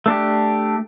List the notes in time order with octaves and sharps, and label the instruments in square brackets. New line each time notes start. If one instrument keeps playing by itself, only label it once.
[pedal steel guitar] A3 D4 G4